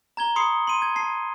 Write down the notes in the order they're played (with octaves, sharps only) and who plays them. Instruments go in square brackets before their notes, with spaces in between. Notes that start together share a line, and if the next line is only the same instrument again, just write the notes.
[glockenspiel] A#5 G#6 G7
B5 C6 D#6 C7 C#7
C6 D#7
G#6
A5 C7